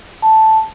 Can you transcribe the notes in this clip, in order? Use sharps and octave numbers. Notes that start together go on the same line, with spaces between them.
A5